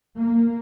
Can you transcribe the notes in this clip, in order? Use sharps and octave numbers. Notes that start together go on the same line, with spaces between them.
A#3